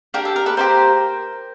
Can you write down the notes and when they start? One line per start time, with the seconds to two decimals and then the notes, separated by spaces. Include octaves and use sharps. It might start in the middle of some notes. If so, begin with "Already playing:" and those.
0.14 A#3 D4 G4 A#4
0.25 A4
0.36 A#4
0.46 A4 B4
0.57 A#3 D4 G4 A#4 C5